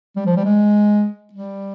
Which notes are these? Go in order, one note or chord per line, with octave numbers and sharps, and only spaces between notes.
G3
F3
G3
G#3
G3